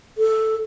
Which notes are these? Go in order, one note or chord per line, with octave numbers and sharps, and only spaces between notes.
A4